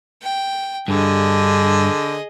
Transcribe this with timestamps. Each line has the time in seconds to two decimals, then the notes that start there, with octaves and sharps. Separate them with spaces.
0.22 G5
0.88 G2 D3 G#4 D#5